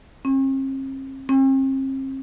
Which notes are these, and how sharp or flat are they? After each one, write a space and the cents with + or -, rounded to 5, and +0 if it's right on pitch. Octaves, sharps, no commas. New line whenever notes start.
C4 +45
C4 +40